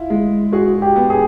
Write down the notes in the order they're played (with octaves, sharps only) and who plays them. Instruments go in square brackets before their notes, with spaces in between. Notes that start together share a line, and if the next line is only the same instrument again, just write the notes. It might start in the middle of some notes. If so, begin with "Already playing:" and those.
Already playing: [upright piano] E4 [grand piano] F4
[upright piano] G#3
[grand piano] F#4 [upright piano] G#4
[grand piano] F#4
G4
[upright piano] B3
[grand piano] G#4